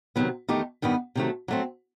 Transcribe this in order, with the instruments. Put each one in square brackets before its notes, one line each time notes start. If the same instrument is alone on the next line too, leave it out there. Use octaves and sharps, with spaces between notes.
[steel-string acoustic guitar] C3 D#3 F#3 B3
E2 D#3 A3 D#4 G4
G2 D#3 G3 B3
C3 D#3 F#3 A3
F#3 A3 C4